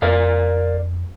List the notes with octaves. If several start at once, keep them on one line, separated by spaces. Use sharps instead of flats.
F2 A#4 D5 F5